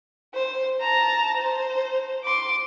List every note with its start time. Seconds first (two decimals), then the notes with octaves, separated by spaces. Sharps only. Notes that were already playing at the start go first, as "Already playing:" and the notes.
0.34 C5
0.80 A5 A#5
1.36 C5
2.24 C6 D6